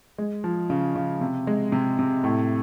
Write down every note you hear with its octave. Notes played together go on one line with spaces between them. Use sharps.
G#3
F3
C#3
C#3
C3
G#3
C3
C3
A2